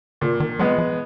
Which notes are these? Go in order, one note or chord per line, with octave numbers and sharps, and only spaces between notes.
A#2 D3
D#3
F#3 G#3 B3
F3